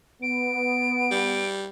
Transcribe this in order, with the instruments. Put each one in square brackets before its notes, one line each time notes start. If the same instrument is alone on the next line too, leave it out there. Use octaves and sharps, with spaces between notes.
[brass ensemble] B3 [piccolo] D7
[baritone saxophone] G3